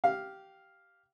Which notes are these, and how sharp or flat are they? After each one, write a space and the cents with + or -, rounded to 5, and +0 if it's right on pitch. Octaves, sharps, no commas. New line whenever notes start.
G4 -15 F5 +0